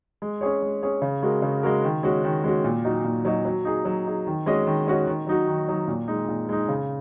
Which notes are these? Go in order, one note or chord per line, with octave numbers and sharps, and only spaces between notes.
G#3
C#4 G#4 C#5
G#3
C#4 G#4 C#5
C#3
G#3 F#4 A#4
C#3
G#3 F#4 A#4
D#3
G#3 C#4 F#4
D#3
G#3 C#4 F#4
A#2
F#3 D#4 F#4 D#5
A#2
F#3 D#4 F#4 D#5
F#3
D#4 G#4
F#3
D#4 G#4
D#3
G#3 C#4 F#4 D#5
D#3
G#3 C#4 F#4 D#5
D#3
F#3 D#4 F#4
D#3
F#3 D#4 F#4
A#2
G#3 D#4
A#2
G#3 D#4
C#3